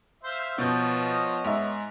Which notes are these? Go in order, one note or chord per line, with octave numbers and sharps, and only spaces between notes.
C5 E5 F5
B2 F3 B3 C#5 D#5 G6
G#2 E5